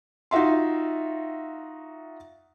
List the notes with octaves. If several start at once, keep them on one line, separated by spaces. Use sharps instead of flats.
D#4 F4 F#4 E5 C6